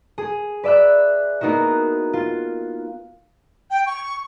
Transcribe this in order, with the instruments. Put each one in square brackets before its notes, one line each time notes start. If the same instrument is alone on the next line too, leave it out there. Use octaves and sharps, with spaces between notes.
[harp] G#4
B4 D5 E5 B5 F#6
A#3 B3 D#4 E4 F#4
F4
[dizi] G5
C#6